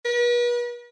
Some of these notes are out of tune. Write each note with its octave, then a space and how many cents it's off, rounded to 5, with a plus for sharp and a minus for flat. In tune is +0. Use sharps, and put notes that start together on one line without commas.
B4 -40